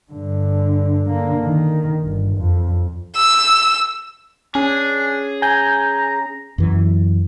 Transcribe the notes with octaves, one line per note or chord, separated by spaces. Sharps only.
G2 D3
D3 A#3
D#3
G1
F2
E6
C#4 D4 G#4
G#5 A#5 G6
F#2 E3